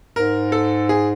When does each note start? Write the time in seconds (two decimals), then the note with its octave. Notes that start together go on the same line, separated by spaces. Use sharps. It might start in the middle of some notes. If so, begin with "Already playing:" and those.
0.16 G#2 A#4
0.52 A4
0.89 G#4